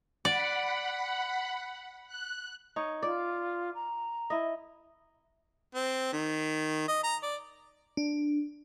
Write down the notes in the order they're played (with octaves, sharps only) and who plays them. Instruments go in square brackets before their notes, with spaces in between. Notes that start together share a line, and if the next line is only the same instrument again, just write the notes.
[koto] D5 [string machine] F#5 B5
[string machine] F#6
[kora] D#4 C#5
[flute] F4 [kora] D5
[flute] A#5
[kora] E4 D#5
[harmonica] C4
D#3
D#5
A#5
D5
[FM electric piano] D4